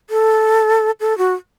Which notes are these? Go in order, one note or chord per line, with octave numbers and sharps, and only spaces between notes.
A4
A4
F#4